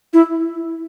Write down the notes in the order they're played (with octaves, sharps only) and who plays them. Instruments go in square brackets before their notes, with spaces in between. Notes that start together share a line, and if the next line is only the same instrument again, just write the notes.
[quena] E4